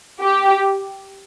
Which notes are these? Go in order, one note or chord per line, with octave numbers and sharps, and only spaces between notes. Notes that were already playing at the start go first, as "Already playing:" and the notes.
G4